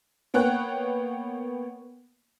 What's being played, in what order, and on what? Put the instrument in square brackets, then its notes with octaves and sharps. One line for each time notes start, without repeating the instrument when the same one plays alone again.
[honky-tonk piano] A#3 B3 C#5 G5 F#6